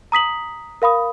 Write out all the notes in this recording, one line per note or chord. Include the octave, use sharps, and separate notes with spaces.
A#5 D#6 B6 F#7
A#4 F5 B5 D#6